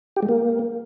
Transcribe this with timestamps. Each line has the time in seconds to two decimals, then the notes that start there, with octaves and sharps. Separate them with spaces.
0.16 G4
0.23 G#3
0.29 A#3